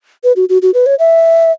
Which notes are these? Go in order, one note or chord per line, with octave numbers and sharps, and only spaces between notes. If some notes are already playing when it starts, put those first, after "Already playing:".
B4
F#4
F#4
F#4
B4
C#5
E5